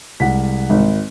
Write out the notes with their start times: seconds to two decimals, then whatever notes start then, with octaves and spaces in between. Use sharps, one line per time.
0.20 C2 G#3 F#5 B6
0.70 G#1